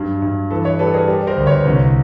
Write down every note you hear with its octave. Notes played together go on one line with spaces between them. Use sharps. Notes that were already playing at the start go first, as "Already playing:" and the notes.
Already playing: G2 F#3
G2
E3 A4 B4
B4 C#5
G3 A4 B4
G#4 A#4
G3
A#4 C5
D2
B4 C#5
C2